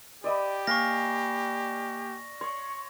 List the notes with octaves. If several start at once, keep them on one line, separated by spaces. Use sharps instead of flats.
G4 D5 D#5 B5
A#3 F5 G#5 C#6 A#6 C7
C#5 C6 C#6